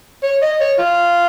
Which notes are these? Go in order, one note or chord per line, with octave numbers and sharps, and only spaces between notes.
C#5
D#5
C#5
F4